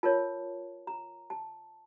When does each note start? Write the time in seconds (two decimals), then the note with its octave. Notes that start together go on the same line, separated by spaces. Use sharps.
0.03 F4 A#4 C#5 A5
0.87 A#5
1.30 A5